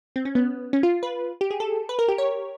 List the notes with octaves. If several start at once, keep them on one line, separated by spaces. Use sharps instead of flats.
C4
C#4
B3
C#4
F4
B4
G4
G#4
A4
B4
A#4
G4
C#5